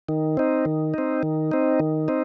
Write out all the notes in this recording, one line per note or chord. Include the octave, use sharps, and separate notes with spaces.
D#3
C4 D#4
D#3
C4 D#4
D#3
C4 D#4
D#3
C4 D#4